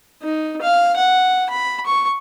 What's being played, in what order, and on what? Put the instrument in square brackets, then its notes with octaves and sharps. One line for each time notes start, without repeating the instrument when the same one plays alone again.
[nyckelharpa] D#4
F5
F#5
B5
C#6